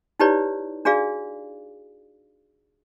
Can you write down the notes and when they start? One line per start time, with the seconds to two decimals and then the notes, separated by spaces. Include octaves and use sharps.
0.20 D#4 E4 G4 B4 C#5 D5
0.85 D4 F#4 G#4 D5 F5